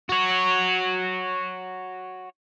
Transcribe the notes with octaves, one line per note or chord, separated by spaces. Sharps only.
F#4 C#5